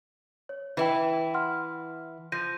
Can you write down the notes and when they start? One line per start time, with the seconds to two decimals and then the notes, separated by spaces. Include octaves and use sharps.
0.49 C#5
0.77 E3 E4 B4 G5
1.34 F#5 C6 F6
2.32 F3 G6 A#6 D#7